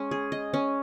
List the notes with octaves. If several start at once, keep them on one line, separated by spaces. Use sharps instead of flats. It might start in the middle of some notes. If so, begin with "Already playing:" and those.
Already playing: G#3 C#4
G#4
D#5
C#4